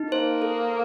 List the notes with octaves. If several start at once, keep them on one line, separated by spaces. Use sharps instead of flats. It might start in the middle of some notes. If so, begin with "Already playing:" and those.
Already playing: D#4
A#3 C5
A4